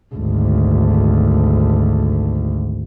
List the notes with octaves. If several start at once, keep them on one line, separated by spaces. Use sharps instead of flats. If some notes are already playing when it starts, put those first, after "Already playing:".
G#1 D2